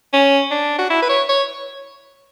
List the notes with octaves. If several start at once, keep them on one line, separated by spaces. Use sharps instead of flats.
C#4
D4
F#4
E4
B4
C#5
C#5